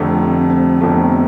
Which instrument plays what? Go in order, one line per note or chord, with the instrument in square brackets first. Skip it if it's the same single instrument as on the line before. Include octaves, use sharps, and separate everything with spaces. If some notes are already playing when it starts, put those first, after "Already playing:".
Already playing: [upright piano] F1 F2 D3 A3
[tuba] C4
C4
[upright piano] F1 F2 D3 A3 [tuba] B3